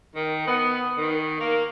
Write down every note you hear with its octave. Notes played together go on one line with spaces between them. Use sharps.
D#3
B3
D#3
A#3